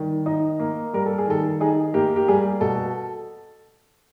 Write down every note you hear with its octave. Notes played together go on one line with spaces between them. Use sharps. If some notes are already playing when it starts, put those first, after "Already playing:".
Already playing: D#3 G3
D#4
A#3
G3 A#4
A4
G#4
D#3 A4
D#4 G#4
A#3 G4
G4
G3 G#4
B2 A4